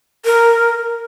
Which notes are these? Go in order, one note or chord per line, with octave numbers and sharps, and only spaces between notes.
A#4